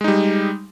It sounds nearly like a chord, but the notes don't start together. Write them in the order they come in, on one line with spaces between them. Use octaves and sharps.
G#3 D#4 G3